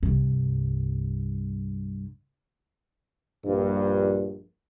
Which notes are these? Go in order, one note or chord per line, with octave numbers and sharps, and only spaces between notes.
C2 G2
A#1 G2